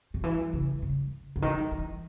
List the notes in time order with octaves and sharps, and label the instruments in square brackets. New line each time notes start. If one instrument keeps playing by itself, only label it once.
[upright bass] D#3
E3
C#3
C#3
C#3
D#3
E3